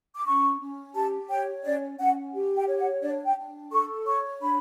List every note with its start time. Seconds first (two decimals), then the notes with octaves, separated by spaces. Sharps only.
0.15 D6
0.26 C#4 C#6
0.60 C#4
0.95 G4 A5
1.30 C#5 G5
1.64 C#4 D5
1.99 C#4 F#5
2.33 G4
2.56 G5
2.68 C#5
2.79 F#5
3.02 D4 D5
3.25 G5
3.37 D4
3.71 A4 C#6
4.06 C#5 C#6
4.41 D4 B5